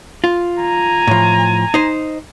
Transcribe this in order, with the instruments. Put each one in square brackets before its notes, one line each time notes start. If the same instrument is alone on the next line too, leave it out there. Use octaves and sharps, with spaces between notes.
[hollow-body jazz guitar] F4
[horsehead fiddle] G#5 A#5
[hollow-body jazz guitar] A2 F3
D#4 C5